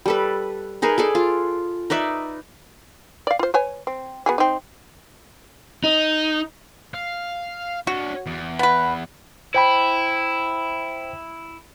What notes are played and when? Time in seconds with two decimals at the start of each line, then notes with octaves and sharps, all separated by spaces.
0.06 G3 A4 B4
0.82 D#4 G#4 A#4 B4
0.98 G#4 A4 D5
1.15 F4
1.90 D#4 B4 D5 E5
3.27 D5 F5
3.39 F4 C5
3.54 B4 C#5 G#5
3.87 C4
4.26 B3 F#4 G#4
4.38 C4 D#4
5.84 D#4
6.94 F5
7.87 D4 F#4 C#5
8.27 E2
8.59 B3 B4
9.54 E4 C5 G5 B5